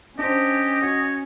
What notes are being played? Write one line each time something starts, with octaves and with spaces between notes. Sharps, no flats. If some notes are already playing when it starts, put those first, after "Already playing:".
C#4 D4 G4 C5 D#5
F#4 C#5